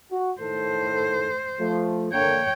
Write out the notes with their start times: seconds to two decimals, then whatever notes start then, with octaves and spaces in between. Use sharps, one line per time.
0.12 F#4
0.41 A2 D#3 A4 C5
1.59 F3 A3
2.13 D3 A#3 C#5 G5